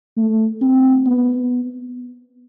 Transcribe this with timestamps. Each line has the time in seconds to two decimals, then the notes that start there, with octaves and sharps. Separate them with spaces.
0.17 A3
0.61 C4
1.07 B3